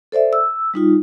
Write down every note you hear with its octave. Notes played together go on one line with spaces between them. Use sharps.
A4 C5 D5 E5
E6
G3 D#4 F4